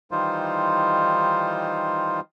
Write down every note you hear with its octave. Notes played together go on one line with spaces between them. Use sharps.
D#3 E3 G3 D#4 F4 C5